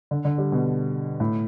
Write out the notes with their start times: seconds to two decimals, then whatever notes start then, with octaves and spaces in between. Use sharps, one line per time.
0.11 D3
0.25 D3
0.38 G3
0.52 B2
1.20 A2